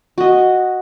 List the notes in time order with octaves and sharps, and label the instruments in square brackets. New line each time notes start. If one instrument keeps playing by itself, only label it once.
[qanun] F#4 D#5